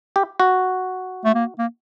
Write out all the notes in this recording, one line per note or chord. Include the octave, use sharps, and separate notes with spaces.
G4
F#4
A3
A#3
A#3